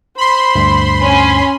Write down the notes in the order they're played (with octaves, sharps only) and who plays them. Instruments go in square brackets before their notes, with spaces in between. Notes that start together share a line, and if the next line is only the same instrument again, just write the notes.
[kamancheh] C5 [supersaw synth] B5 C6
[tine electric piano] D2 G2
[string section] C#4